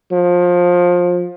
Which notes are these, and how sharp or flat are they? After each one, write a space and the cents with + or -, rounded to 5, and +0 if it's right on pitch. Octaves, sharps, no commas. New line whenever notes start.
F3 +25